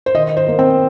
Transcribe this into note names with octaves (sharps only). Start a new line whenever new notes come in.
C5
D#3 D#5
C5
A#3
C4